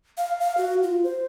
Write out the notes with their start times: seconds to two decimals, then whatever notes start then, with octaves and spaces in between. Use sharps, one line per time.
0.17 F5
0.40 F5
0.57 F#4
0.83 F4
1.04 C5